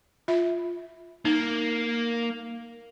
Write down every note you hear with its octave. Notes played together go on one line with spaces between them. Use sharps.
F4 E5
A#3 D#4